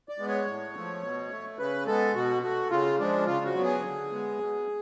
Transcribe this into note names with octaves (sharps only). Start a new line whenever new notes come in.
D5
G#3 B3
C#5
A2
F3 A3
B2
A3
C#3 B4
G#3 B3 A4
B2 F#4
A3 F#4
C#3 F4
F3 G#3 D4
C#3 F4
F#4
F#3 B3
G#4
D3
G#3 B3
B2